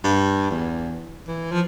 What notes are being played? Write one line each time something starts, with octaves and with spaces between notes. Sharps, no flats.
G2
E2
E3
F3